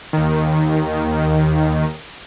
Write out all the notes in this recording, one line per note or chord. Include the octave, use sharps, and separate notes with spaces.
D#2 D#3